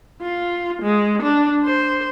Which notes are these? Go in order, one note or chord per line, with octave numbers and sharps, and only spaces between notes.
F4
G#3
D4
C5